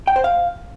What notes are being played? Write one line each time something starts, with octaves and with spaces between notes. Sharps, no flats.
G5
C5
F5